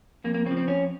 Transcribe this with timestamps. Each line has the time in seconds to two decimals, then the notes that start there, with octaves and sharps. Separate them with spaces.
0.24 F2 A#3
0.34 A#3
0.46 C#3 C4
0.51 F3
0.57 C4
0.67 F2 C#4